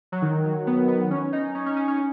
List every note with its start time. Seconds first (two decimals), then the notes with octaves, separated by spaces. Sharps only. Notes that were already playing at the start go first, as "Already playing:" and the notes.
0.12 F#3
0.22 D#3
0.44 F#3
0.67 B3
0.88 B3
1.11 C#4
1.33 D#4
1.55 C#4
1.66 C#4
1.77 C#4
1.88 C#4